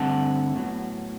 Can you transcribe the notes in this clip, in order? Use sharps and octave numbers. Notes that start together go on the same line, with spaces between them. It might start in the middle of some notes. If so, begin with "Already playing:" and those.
Already playing: G2 D3 A3 C4 F#5 A5
A2 F#3 B3